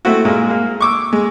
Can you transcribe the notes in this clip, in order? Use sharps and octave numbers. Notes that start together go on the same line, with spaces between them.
A3 C4 E4 F#4
A#2 G#3
A#3
C#6 D6 E6
G#3